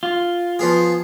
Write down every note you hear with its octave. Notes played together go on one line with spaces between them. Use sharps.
F4
F3 B3 G#4